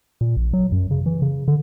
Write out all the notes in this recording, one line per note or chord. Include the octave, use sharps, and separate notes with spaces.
A#2
A#1
F#3
F#2
C#3
E3
C#3
D3